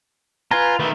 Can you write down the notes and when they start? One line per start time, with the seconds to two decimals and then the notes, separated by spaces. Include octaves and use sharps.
0.51 F4 B4 G#5 A#5
0.80 D#3 A3 B4